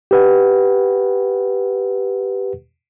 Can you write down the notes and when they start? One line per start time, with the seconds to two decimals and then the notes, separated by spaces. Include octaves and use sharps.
0.11 G4 B4 F#5